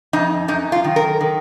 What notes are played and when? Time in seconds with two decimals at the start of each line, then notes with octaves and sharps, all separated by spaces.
0.13 F2 D#4
0.48 F#2 D#4
0.72 F4
0.84 D#3
0.96 A#4
1.21 D#3